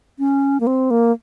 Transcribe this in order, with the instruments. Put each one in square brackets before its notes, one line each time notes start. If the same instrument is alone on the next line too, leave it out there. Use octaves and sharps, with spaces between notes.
[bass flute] C#4
A#3
C4
A#3